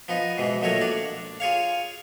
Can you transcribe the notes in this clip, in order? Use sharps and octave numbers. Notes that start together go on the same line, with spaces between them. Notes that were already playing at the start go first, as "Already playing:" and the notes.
F3 B3 D#4
G#2 B2 E3
A#1 D#3 F#3 A3 A#4 C#5
D4 D5
F4 G#4 C#5 F5